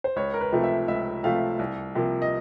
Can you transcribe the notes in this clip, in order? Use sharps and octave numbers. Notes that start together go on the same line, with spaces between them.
C5
C#2 C#5
A#4
B4
C3 F3 A3
E5
C#2 E5
C3 F3 A3 F5
C2
C3 F3 A#3
D#5